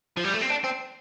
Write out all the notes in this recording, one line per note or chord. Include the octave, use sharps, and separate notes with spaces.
F3
G3
A3
C4
D4
C4